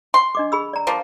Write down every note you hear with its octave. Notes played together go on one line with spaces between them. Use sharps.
C6
D4 D#5 D6
G#4 B5 E6
D5 A#5
F3 A#3